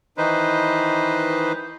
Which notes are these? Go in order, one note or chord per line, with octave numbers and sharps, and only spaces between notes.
D#3 E3 D#4 B4 C5